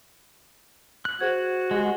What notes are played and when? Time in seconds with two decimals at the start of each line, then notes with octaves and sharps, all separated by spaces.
1.05 F#6
1.20 F#4 G#4 C5 G#6
1.71 G#3 G4 F#5